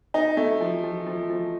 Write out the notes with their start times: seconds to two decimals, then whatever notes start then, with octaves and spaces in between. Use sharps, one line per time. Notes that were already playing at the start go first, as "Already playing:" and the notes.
0.14 D#4
0.37 A3
0.61 F3
0.84 F3
1.06 F3
1.30 F3